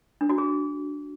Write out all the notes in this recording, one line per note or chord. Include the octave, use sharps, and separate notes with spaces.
D4
F#4
G#4